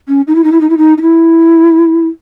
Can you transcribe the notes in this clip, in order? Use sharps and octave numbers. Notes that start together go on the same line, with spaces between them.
C#4
D#4
E4
D#4
E4
D#4
E4
D#4
D#4
E4